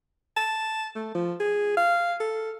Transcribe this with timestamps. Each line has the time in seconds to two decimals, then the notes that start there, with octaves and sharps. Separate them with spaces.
0.37 A5
0.95 A3
1.15 F3
1.40 G#4
1.77 F5
2.20 A4